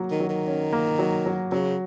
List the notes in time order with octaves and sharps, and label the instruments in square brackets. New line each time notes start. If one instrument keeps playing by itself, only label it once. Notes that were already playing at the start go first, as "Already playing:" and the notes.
Already playing: [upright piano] F#3 A#3
[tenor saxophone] D#3
[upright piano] F#3
[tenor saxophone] D#3
[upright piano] C#4
A#3
F#3
F#3
[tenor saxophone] C#3 [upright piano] F#3